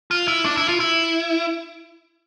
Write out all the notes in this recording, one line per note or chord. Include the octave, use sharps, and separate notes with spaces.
F4
E4
D4
E4
F4
E4